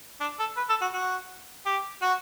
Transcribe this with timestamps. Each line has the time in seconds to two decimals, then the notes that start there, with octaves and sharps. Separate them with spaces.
0.21 D4
0.39 A4
0.57 B4
0.69 A4
0.81 F#4
0.94 F#4
1.66 G4
2.02 F#4